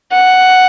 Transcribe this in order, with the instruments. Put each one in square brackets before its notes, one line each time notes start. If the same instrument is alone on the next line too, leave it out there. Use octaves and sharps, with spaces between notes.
[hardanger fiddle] F#5